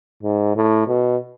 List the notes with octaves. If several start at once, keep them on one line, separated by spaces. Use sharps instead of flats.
G#2
A2
B2